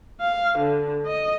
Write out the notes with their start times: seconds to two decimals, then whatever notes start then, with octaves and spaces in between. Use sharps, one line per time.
0.21 F5
0.59 D3
1.06 D#5